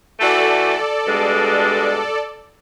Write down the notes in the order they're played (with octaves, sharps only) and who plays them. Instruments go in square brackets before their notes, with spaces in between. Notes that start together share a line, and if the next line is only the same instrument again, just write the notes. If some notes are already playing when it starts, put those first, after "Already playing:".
[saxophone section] E3 A3 F#4 [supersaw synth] A4 D5
[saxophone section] G2 B2 G#3